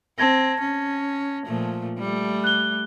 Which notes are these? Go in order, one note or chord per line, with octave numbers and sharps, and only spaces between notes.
C4 A5 G#6 A#6
C#4
A#2 F3 A3
G3 A3
F#6 G7